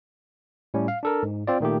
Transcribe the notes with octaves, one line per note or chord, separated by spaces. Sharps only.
A2 G3 C#4
F5
D4 A4 A#4
G#2
C4 F4 D5
A#2 D#3 A3 G4